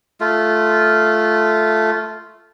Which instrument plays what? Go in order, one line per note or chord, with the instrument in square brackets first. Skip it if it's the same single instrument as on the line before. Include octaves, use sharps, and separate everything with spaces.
[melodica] A3 F4